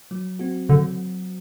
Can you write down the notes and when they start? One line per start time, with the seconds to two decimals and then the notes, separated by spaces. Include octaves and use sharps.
0.11 F#3
0.39 C4 F#4
0.69 D3 F#3